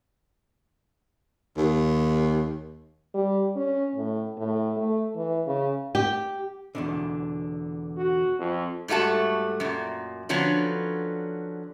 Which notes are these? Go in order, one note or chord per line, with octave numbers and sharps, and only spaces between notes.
D#2
G3
C#4
A2
A2
A3
E3
C#3
G4
E2 B2 D3
F#4
F2
G#2 G3 A3 F#4 A5
F#2 A#2
D3 F3 F#3 B3 C#4